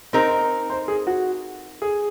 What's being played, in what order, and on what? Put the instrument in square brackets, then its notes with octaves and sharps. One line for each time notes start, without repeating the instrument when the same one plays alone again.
[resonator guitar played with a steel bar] C4 D#4 A#4 [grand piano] C5
[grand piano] C5
C5
G#4
F#4
G#4